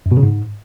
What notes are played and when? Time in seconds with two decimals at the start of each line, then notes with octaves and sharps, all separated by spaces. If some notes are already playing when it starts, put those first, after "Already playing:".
0.06 F#2
0.11 B2
0.17 C#3
0.23 G#2